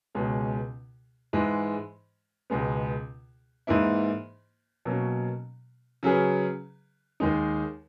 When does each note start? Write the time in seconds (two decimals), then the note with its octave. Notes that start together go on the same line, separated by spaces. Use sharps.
0.15 C#2 B2 G#3 C#4
1.33 G#2 E3 G#3
2.50 C#2 B2 G#3 B3
3.67 G#2 E3 A#3 E4
4.85 B2 F#3 A#3 C#4
6.03 C#3 F#3 C#4 G#4 B4
7.20 D#2 D#3 G#3 D#4